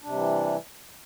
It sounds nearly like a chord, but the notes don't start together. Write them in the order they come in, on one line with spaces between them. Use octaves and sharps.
D4 C3 G3 E3